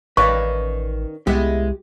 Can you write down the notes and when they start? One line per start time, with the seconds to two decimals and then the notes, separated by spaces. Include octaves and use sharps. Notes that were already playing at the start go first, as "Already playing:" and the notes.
0.17 A1 D#3 C#4 B4 D5 F5 C#6
1.27 C2 G#3 B3 E4 G4